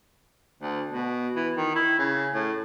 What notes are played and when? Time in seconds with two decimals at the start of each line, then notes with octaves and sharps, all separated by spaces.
0.62 D2
0.90 B2
1.36 E3
1.57 D#3
1.76 E4
1.99 C#3
2.34 A2